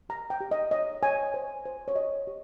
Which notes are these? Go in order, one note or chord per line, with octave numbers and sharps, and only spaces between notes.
G4 A#5
G5
G4
D#5
C#5 D#5
C#5 G#5
C5
C5
C#5
G4 D#5
G4